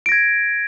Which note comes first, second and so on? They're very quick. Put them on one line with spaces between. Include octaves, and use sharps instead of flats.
D7 A#6 G#6